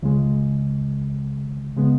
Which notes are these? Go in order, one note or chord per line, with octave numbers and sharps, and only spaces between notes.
C#2 C#3 G#3
C#3 G#3 B3